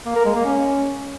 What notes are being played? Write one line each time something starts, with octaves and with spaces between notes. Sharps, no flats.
A#3
A#4
G#3
A#3
C#4